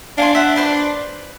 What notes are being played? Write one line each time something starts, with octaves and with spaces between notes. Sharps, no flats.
D4 F5 G#5 C6
E5 F#5
B4 C5 C6